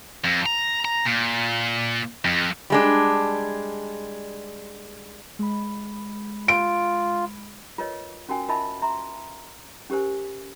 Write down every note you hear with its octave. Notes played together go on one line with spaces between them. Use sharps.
F2
A#5
A#5
A#2
F2
G3 G#3 D4
G#3 B5
F4 D7
F4 A#4 B4 C#5 D#5
C#4 F#4 A#4 G5 G#5
F4 A#4 D#5 E5 A5 B5
E5 A#5 C6
C#4 G4 A#4 C5 G#5